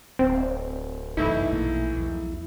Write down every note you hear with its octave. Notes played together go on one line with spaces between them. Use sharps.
D1 C4
G1 C2 F#2 E3 A3 D#4 E4
A#1 B2 A#3
B1 E2 F3